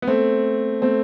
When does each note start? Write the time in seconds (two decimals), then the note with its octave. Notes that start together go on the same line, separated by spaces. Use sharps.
0.02 B3
0.07 A3 C4
0.82 A3 C4